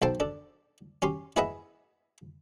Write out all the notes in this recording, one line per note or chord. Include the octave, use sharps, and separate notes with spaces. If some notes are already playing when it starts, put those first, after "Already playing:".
B1 A4 C5 G5 A5
D4 A4
C#4 G4 C6
E4 G#4 B4 D#5 E5 F#5